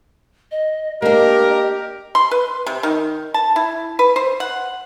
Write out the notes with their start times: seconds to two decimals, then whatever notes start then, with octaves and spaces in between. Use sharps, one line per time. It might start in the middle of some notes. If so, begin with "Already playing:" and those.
0.51 D#5
1.02 A#3 D4 G4 A#4 D#5
2.15 C6
2.31 B4
2.66 C3
2.83 D#3
3.34 A5
3.56 E4
3.99 B4
4.16 C5
4.40 F#5